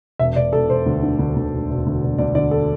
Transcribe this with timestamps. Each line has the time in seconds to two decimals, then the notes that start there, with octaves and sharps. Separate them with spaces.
0.19 E1 E5
0.36 E1 D5
0.53 E1 A4
0.70 E1 C5
0.86 D2
1.03 D3
1.19 D2
1.36 D2
1.52 E1
1.70 E1
1.86 D2
2.03 E1
2.18 D2 D5
2.35 D3 D5
2.51 A4